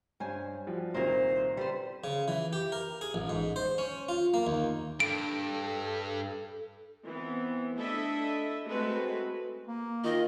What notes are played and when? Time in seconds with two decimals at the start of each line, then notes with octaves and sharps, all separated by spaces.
0.20 G2 C5 C#5 G#5
0.67 F3 G3 F#4
0.94 C2 A#2 D#3 A#3 E4 C5
1.57 G3 B4 C5
2.04 C#3
2.28 E3
2.53 G4
2.72 A#4
3.01 G#4
3.14 A1
3.29 G#2
3.56 C5
3.78 C#4
4.09 F4
4.34 A#3
4.47 D#2
5.00 G2 A4 D7
7.05 E3 B3 C4
7.77 A3 D4 E4 A4 D#5 E5
8.67 G#3 A3 C4 F#4 B4
9.67 A#3
10.04 D#3 F4 D#5